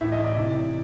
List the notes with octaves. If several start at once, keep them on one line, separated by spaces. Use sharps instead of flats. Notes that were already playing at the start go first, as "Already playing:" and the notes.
A2 E3 E5
D#5
D5
C3 E3